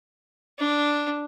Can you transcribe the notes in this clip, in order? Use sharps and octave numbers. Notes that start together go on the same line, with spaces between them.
D4